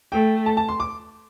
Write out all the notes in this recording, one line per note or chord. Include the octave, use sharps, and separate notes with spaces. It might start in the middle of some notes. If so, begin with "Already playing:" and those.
A3 G5
A5
A5
C6
D6